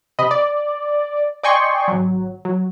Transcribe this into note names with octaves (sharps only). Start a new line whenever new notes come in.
C3 D#5 B5
D5
D5 D#5 G5 G#5 C6 C#6
G#1 F#3
F#3